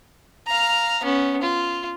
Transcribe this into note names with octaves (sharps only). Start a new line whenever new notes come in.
F5 A#5
B3 C#4
F4